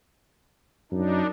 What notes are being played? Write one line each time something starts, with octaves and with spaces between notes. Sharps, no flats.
F#2 D4 D#4